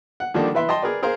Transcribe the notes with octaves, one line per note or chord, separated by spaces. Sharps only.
F#5
D3 D#3 F3 G3 A#3 D4
E3 B4 E5 C6
D#5 G5 A5 C6
G#4 A#4 B4 D5
G#4 A#4 C5 F5